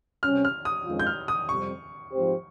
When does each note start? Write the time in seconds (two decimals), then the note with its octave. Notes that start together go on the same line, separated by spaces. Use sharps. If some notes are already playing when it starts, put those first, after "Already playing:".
0.23 C3 G3 C#4 F6
0.45 F6
0.65 D#6
0.86 F2 D#3 G#3 C#4 F4
1.00 G6
1.07 F6
1.28 D#6
1.49 F2 C3 G3 C4 C#6
2.12 G#2 F3 C4 G4 C5